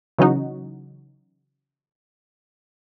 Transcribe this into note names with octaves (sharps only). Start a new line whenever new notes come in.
C#3 E3 F#3 C#4 D#4 F#4